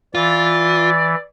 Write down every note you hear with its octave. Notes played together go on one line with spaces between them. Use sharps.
E3 F4 D5